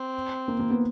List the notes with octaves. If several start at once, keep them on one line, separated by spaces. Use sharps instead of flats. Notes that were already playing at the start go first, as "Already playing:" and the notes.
Already playing: C4
A#3
A#3
B3